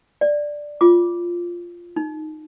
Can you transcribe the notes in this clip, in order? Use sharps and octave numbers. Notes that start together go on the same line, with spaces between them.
D5
F4 D6
D#4